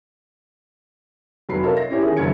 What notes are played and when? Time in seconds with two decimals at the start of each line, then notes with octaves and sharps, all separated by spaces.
1.49 F1 F#3 B5 C7
1.63 F4 A4 A#4 C#5 D#5 E5
1.77 A#6
1.90 C#4 E4 G4 C#5 E5
2.02 D#3 C#4 G#4
2.17 F#1 F#2 D3 G#6 C#7